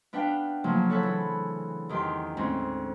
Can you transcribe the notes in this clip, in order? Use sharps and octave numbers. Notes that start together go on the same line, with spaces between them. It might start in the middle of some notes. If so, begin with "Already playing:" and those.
B3 D4 B4 F5 G5
C#3 F3 F#3 A3 A#3
A4 C#5 F#5 B5
E3
E2 D#3 G4 C6
D2 G#2 C4 C#4